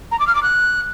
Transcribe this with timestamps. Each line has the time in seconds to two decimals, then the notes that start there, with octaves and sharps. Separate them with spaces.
0.12 A#5
0.19 D6
0.27 F6
0.35 D6
0.43 F#6